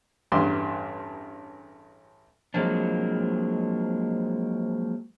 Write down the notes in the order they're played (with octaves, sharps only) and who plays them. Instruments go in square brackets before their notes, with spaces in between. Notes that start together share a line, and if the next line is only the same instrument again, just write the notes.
[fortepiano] A1 E2 G2 C6 D6
[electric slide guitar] F3 F#3 G#3 A#3 C4 D4